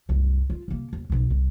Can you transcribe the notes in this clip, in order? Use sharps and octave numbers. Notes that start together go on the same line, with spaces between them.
C2 F#2
F4
C3 A#3
D#2
B1 B2
C2